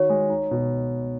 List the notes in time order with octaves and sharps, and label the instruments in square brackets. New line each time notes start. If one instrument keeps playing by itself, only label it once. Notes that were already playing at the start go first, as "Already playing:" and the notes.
Already playing: [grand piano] D#3 F#4 [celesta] C#5
[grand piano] G#3
D#4
B2